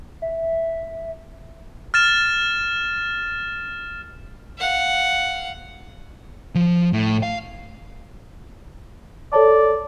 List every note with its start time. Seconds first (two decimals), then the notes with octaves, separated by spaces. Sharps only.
0.22 E5
1.94 F6 A6 E7
4.58 F5 F#5
6.55 F3
6.93 A2
7.23 F5
9.33 A4 C#5 D5 A5